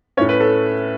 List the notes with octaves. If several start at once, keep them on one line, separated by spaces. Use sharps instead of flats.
A2 A3 C#4 C#5
B4
A4